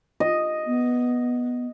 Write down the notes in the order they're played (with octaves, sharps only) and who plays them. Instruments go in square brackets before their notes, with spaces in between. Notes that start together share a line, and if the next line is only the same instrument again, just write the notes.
[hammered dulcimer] D#5
[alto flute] B3